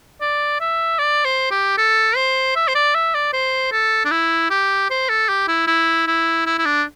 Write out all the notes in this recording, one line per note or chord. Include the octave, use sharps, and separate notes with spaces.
D5
E5
D5
C5
G4
A4
C5
E5
C5
D5
E5
D5
C5
A4
D4
E4
G4
C5
A4
G4
E4
E4
E4
E4
E4
D4